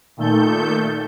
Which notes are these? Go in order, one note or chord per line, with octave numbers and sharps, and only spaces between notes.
A#2 D#3 A3 A4 G6